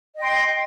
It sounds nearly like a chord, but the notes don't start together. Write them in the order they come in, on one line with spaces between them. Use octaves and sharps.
D#5 G5 C6